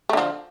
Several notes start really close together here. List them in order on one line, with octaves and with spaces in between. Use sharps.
A3 D3 F3